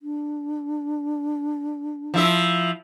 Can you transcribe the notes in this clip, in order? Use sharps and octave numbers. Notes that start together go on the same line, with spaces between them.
D4
F3 E4 E5